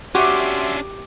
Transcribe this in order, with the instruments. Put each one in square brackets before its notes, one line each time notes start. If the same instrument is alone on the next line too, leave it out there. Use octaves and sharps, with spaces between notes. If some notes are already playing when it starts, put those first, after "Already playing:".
[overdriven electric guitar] C#4 D4 [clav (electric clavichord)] F#4 [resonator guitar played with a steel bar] G4 [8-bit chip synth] E5 C6